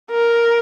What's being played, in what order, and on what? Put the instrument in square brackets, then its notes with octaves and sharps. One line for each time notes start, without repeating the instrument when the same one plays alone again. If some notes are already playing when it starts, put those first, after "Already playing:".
[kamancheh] A#4